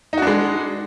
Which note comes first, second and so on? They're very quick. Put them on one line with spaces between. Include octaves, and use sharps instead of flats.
D#4 F#4 D4 G#3